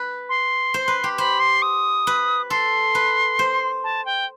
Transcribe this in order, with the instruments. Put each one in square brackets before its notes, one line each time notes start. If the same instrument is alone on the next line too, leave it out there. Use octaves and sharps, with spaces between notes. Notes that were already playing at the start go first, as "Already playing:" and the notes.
Already playing: [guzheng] B4
[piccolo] C6
[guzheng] C5
B4
G4
[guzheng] C5 [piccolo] B5
[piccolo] C6
D#6
[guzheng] B4
[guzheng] A4 [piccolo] C6
[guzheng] B4
C5
[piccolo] A5
G5